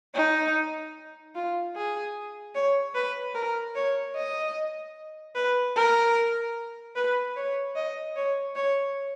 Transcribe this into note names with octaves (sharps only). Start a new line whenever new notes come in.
D#4
F4
G#4
C#5
B4
A#4
C#5
D#5
B4
A#4
B4
C#5
D#5
C#5
C#5